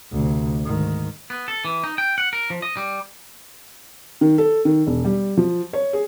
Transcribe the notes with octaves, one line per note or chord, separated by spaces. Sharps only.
D2 C3
G#2 D#3
B3
A4
E3
D#4
G5
F#5
A#4
F3
D#5
G3
D#3
A4
D#3
E1
G3
F3
C#5
G#4